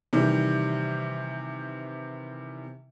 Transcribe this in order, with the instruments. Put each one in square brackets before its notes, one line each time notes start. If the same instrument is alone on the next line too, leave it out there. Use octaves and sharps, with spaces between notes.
[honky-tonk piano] C3 D#3 E3 G3